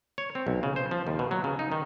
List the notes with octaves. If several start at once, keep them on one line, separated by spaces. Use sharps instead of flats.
C#5
C4
B1
C#3
C5
F3
D#2
B2
F#3
C#3
D#4
D#3